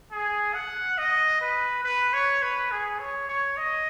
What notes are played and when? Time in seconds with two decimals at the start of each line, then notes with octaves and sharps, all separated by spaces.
0.11 G#4
0.55 F#5
0.98 D#5
1.41 B4
1.84 B4
2.14 C#5
2.43 B4
2.72 G#4
2.99 C#5
3.29 C#5
3.57 D#5